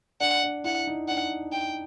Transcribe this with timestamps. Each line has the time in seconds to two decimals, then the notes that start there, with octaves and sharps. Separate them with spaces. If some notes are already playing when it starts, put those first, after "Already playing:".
0.20 D4 F#5
0.43 D4
0.64 E4 F#5
0.87 D#4
1.08 D4 F#5
1.52 G5